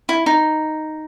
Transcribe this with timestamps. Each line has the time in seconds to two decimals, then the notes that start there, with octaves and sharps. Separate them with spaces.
0.09 E4
0.26 D#4